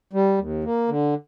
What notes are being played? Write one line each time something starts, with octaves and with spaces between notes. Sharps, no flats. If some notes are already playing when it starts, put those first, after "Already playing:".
G3
D#2
A#3
D3